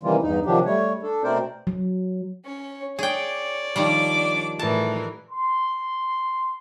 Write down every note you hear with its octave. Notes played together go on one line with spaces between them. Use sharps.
C3 D#3 E3 G3 A#3 F4
E2 G2 D#4
C3 D#3 F3 F#3 D4 G4
G3 A3 C#5
D4 A4
B2 A3 C4 A#4 C5 D5
F#3
C#4 C#5
G#4 C#5 D5 G5
D#3 F3 G3 D4 D6
A2 E3 A#4 A5
C6